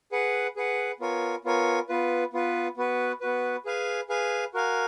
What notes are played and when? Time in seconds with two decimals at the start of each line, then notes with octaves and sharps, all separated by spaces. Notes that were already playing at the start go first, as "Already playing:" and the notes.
0.12 G#4 B4 F#5
0.56 G#4 B4 F#5
1.00 B3 F4 A#4 C#5 G#5
1.44 B3 F4 A#4 C#5 G#5
1.89 B3 F4 B4
2.33 B3 F4 B4
2.77 B3 F#4 B4
3.21 B3 F#4 B4
3.65 G#4 B4 F5 G#5
4.09 G#4 B4 F5 G#5
4.54 F#4 A#4 F5 G#5